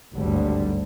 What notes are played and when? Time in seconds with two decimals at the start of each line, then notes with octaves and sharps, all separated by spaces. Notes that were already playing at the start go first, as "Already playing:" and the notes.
0.14 G#1 D2 G2 D3 F#3 G3